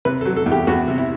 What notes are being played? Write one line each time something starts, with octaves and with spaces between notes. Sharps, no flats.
C3 B4
A4
F#3
A4
E2
G4
E2 F#4
C3
E4